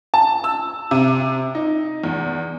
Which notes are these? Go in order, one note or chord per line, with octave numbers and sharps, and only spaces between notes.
A5
E6
C3
D#4
E2